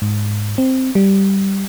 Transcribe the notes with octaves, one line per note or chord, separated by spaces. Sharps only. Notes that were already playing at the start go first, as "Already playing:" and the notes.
G#2
C4
G3